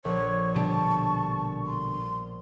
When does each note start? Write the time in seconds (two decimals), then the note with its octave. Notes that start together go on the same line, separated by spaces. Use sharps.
0.05 A#1 C#5 C#6
0.56 B2 D3 G3 A5
1.66 C6